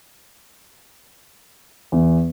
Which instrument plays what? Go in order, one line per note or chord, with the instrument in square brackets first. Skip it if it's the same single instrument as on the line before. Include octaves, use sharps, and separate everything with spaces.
[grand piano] E2